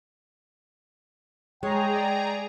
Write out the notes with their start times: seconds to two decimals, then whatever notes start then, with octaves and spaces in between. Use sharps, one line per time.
1.63 G#3 G#4 C#5 G5 A#5
1.95 D5